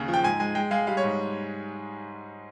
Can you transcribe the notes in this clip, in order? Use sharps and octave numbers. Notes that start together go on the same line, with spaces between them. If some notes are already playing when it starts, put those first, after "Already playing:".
Already playing: D#2 C#3
F3
G5
G#2 G#5
G#3 G#5
G#3 G5
G#3 F5
G3 F5
C#5
G#2